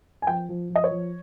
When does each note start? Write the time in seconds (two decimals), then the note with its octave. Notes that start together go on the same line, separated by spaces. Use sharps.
0.22 G#5
0.27 F3 G5
0.49 F3
0.70 F3
0.76 D#5
0.84 C#5
0.91 F3